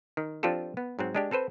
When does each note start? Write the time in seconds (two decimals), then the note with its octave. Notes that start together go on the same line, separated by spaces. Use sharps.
0.17 D#3
0.43 F3 C4 D4 F4 G4 A4
0.77 B3
0.99 G#2 F#3 C4
1.15 G#3 D4 G4
1.31 C4 A4 B4 C5